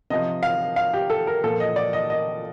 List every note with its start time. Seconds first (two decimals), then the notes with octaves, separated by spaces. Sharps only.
0.10 C3 F3 D#5
0.43 F5
0.76 F5
0.94 G4
1.10 A4
1.27 A#4
1.44 A#2 F3 A4
1.60 D#5
1.76 D5
1.93 D#5
2.10 D#5